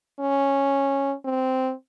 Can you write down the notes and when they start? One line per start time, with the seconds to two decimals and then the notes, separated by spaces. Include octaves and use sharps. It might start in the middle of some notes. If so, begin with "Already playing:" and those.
0.20 C#4
1.25 C4